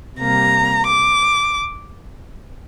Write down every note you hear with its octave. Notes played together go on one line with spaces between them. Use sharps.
C3 G3 A#3 A#5
D6